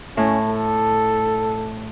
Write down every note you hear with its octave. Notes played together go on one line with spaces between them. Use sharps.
A2 C#4
A4